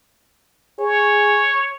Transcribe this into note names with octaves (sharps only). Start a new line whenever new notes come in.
G#4 C#5